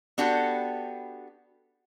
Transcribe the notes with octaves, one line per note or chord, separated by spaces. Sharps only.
B3 D4 F#4 G4 A4